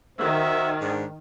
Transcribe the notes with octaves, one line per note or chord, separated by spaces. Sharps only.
D#3 F#4 C5 E5
G#2 D4